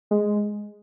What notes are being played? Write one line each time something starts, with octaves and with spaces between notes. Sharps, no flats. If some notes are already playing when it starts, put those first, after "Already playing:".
G#3